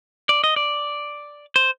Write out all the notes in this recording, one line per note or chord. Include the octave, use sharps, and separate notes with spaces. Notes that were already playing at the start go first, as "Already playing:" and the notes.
D5
D#5
D5
C5